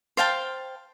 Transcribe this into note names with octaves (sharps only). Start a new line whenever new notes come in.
C5 F5 G5 A5